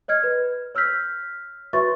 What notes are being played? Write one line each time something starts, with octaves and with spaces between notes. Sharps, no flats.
C#5 D#5 F6 G#6
B4
C#5 E6 F6 G6 B6
F#4 B4 C#5 E5 C#6 A6